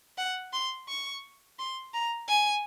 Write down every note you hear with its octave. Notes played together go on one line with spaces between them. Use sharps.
F#5
C6
C#6
C6
A#5
G#5